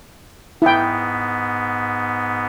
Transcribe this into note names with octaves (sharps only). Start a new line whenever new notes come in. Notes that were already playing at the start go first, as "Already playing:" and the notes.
G#2 B3 E4 G5